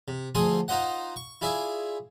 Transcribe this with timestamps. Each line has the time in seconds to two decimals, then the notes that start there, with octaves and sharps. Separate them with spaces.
0.08 C3
0.35 D2 F3 G#4 A4 C6 D#6
0.68 D#4 F4 C5 D#5 F#5
1.16 C#6
1.41 E4 F4 G#4 D5 E5